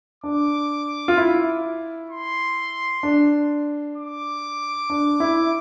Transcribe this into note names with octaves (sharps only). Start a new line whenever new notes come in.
D4 D6
F4
E4
C6
D4
D6
D4
E4